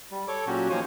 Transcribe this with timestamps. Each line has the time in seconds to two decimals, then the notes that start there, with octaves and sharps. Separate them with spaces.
0.11 G3
0.28 A4 C#5 D6
0.47 A#2 F#3 C#4 F#4 G4
0.70 D#3 F3 A#3 C5 C#5 G#5